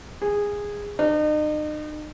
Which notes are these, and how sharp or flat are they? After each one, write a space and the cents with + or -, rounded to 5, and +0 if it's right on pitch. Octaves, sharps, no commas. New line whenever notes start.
G#4 -15
D#4 -40